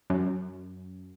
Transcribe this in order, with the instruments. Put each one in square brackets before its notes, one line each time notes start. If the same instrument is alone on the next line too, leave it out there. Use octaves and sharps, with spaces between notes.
[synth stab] F#2